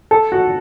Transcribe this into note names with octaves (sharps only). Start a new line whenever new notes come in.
A4
F#4